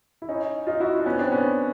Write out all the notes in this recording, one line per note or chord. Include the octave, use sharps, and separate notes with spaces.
E4
C#4 D#4
D#4 F4
E4 F#4
D4
B3 C#4
C4 D4
B3 C#4